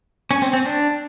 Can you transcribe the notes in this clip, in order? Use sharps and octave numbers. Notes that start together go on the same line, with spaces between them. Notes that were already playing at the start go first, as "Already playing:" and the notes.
C#4
C4
C4
D4